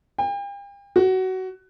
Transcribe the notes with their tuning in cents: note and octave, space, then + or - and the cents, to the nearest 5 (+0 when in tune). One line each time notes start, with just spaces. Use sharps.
G5 +40
F#4 +20